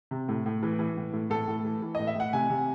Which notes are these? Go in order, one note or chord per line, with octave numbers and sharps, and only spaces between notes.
C3
A2
A2
E3
E3
A2
A2
A2 A4
A2
E3
E3
A2 D#5
E5
A2 F#5
C3 G#5
C3